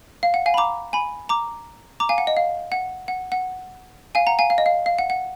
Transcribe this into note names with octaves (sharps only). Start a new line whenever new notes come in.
F5
F#5
F5 G#5
B5
A#5 D6
G#5 B5
A#5 D6
A#5 D6
F5 G#5
F#5
D#5
F5
F#5
F#5
F#5
F5 G#5
F#5 A#5
F5 G#5
F5
D#5
F5
F5
F#5
F#5